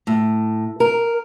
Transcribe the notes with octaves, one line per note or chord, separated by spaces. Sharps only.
A2
A#4